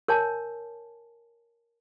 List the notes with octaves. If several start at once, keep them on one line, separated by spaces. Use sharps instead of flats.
A#4 C#5 G#5 A5